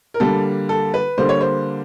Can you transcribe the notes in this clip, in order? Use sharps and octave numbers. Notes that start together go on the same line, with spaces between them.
A#4
D3 G3 A#3 A4
A4
B4
D3 G3 A#3 C5
C#5
C5